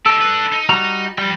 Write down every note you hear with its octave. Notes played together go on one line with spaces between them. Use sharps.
D#4 G4 A4
D4 B4
D#4
G3 F#4 A#5
F3 G3 G5